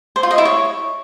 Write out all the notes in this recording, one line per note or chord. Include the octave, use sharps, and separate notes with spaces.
C5
F4
D#5
E4
C#5